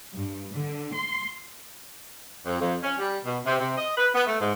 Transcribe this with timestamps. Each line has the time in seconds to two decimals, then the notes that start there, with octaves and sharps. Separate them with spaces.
0.13 G2
0.53 D3
0.92 C6
2.46 F2
2.60 F2
2.82 C#4
2.98 G3
3.25 B2
3.45 C3
3.59 C3
3.77 D#5
3.97 B4
4.15 B3
4.27 A3
4.40 G#2